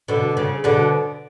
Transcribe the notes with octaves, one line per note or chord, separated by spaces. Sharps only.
B2 D3
C#3
B2 D3